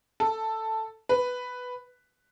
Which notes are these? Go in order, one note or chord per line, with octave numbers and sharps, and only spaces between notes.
A4
B4